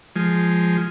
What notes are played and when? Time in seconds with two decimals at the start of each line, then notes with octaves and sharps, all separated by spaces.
0.16 F3 G#3